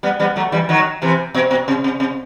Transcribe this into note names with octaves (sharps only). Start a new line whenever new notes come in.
G3 B3
G3 B3
F#3 A3
E3 G3
D#3 F#3
C3 E3
B2
B2
C3
C3
C3